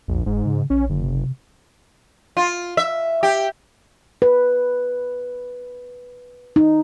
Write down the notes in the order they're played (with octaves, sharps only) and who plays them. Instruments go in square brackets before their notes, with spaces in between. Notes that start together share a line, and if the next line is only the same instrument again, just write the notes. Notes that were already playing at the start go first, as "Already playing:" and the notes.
[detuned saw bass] A#1 [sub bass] E2
[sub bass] F#1 [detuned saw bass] G#2
[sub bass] C#3
[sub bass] A#1 [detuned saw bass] C#4
[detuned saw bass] F#1 [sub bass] D3
[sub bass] C3
[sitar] F4
E5
G4
[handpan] B4
D#4